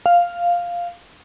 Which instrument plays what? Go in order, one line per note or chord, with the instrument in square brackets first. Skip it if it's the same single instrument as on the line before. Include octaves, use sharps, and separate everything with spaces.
[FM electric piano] F5